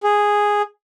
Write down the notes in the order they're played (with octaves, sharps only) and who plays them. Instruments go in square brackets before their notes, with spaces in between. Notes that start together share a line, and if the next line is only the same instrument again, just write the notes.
[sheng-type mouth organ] G#4